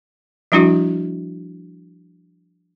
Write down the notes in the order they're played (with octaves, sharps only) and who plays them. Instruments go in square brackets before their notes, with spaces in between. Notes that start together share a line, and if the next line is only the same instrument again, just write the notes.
[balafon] F3 G3 D4 E4 F#4